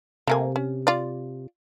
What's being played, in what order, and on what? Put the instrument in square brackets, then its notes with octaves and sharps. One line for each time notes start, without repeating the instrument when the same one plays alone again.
[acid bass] C3 [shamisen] A3 A#3 G#5
[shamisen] C#4
F4 D5